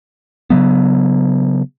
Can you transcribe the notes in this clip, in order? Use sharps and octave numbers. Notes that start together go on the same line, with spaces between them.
C#3 F#3 B3